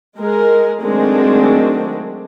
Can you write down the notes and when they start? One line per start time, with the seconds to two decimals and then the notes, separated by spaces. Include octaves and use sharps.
0.17 G#3 G#4 A#4
0.81 D#3 F#3 G#3 A3 C4 D4